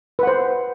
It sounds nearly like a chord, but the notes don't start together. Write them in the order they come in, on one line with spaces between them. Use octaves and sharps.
B4 F#5 C5